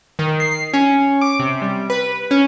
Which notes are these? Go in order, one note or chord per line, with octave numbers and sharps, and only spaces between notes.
D#3
C7
C#4
D6
C3
G3
B4
C#4